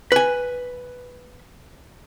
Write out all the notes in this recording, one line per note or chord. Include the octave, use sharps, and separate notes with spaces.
B4 G#5